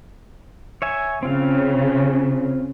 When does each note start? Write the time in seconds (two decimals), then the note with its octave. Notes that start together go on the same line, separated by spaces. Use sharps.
0.82 C#5 E5 G#5
1.23 C#3 C4 F4 F5